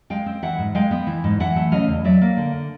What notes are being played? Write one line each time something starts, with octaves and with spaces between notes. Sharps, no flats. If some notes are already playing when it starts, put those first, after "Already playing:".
G#3 F5 G5
C4
E3 E5 F#5
G#2
G#3 F5 G5
B3
E3
G#2
E3 E5 F#5
A3
C#3 D#5 F5
E2
F#3 D5 E5
A#3
D3